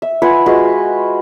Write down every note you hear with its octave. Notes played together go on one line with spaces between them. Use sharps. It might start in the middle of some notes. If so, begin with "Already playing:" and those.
E5
F4 B4 F#5 G#5
G#3 F4 F#4 B4